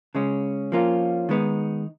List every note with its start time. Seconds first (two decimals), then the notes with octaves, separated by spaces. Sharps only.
0.15 C#3 G#3 C#4
0.72 F3 A#3 C#4 F4
1.29 D#3 G#3 B3 D#4